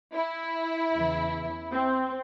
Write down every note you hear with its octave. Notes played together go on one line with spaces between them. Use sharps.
E4
E2 C#3 E3
C4